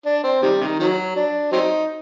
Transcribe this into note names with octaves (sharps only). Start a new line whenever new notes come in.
D4
C4
C3 D#3 G3
C3 D#3
D#3 F#3
D4
F#3 C4 D#4